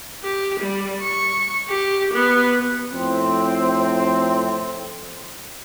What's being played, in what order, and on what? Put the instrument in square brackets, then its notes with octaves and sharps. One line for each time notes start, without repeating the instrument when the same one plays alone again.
[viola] G4
G3
C#6
G4
B3
[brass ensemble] F2 A2 C4